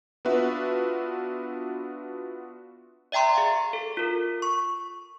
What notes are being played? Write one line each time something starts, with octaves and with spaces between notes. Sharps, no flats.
B3 D4 F4 F#4 B4 E5
D5 E5 G5 A#5 C6
G#4 F5
A4
F4 A#4
C#6